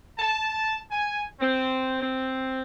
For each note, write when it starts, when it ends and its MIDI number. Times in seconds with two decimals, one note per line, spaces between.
0.18 0.77 81
0.91 1.23 80
1.40 1.97 60
2.00 2.62 60